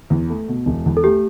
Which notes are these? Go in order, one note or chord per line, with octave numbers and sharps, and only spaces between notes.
E2
A3
B2
E1
E2
A4
A3 G4